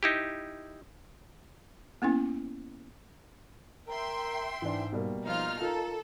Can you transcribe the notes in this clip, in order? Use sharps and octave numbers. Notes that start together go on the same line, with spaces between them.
D#4 E4 G4
A#3 B3 C#4 E4
A#4 E5 G5 C6
G#2 E3 D4
B2 G3 A#3
F3 D#4 F4 F6
F4 A4 A#4